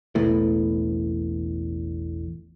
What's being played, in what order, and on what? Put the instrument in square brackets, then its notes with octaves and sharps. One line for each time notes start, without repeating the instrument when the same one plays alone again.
[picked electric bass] E1 A1 E2 A2